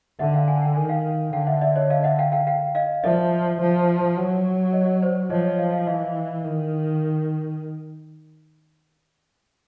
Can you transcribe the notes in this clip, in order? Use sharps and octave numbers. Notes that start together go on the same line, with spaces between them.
D3 E5 F#5
F5 G5
F#5 G#5
G5
D#3 G#5
F5 G5
D3 F5 G5
E5 F#5
D5 E5
C#5 D#5
D#5 F5
E5 F#5
F5 G5
F5 G5
F5 G5
D#5 F5
F3 D5 E5
F3
F#3
C#5 D#5
C5 D5
F3 C#5 D#5
C#5 D#5
D#5 F5
D#5 F5
E3 D#5 F5
D#3